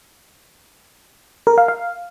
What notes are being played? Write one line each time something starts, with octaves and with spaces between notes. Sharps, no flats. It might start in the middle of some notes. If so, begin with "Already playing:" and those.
A#4
F5
F5